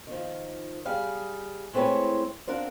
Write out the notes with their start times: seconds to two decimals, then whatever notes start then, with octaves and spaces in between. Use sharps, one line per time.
0.07 D#3 F3
0.85 G3 G#4 F5
1.73 G#3 A3 C4 E4 B4 C#5
2.47 C4 D4 A#4 F5 F#5